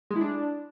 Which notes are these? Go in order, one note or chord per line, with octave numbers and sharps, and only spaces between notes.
G#3
E4
D4